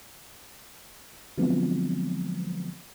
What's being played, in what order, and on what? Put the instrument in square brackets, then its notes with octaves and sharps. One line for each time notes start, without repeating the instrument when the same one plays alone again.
[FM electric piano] D3 F3 F#3 G#3 B3 C4